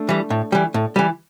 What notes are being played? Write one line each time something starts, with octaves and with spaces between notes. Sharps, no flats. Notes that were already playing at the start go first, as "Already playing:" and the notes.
Already playing: A3 D4
E3 G3
A2
E3 G3
A2
E3 G3